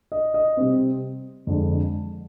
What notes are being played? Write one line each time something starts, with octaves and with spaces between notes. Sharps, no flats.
D#5
D#5
C3 G3 C4
F2 D3 G#3 D4